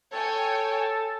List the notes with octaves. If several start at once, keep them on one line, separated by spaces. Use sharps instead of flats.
A4 C#5 G5 G#5